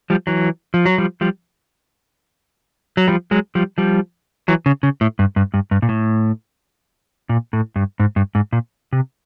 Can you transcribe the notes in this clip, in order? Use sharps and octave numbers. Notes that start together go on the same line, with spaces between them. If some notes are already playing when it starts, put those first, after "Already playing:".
F3 G3
E3 F#3
F3
F#3
F3 G3
F3 G3
F#3
F3 G3
F#3 G#3
F3 G3
F3 G3
E3 F#3
C#3
C#3
A2
G2
G2
G2
G2
A#2
A2
A#2
A2
G2
G#2
G2
G#2
A#2
C3